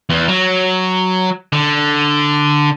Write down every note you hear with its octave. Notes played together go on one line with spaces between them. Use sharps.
E2
F#3
D3